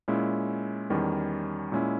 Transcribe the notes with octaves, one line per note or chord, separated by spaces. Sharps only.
A#2 G#3 C#4 E4
E2 D#3 G3 C#4
A#2 G#3 C#4 E4